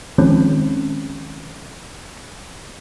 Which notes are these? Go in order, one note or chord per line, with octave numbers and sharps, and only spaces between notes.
D#3 F3 G#3 C4 C#4